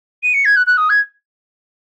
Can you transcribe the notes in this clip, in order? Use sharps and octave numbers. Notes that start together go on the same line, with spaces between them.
D#7
C#7
G#6
F#6
F#6
D#6
G#6